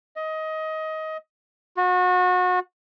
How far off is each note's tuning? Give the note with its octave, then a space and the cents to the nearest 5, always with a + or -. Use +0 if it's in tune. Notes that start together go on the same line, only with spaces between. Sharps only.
D#5 +20
F#4 -30